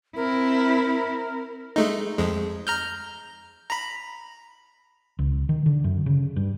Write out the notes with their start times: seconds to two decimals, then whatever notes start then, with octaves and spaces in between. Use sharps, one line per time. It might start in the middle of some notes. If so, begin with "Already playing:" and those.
0.16 C4 E4 A#4
1.76 G#3 A3 D#4
2.18 F2 G#3
2.67 A#5 F6 G6
3.70 A#5 B5
5.19 C#2
5.49 D#3
5.66 D3
5.84 F#2
6.06 C#3
6.36 G2